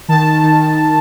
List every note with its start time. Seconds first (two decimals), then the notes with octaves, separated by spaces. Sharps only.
0.08 D#3 A5
0.43 D#3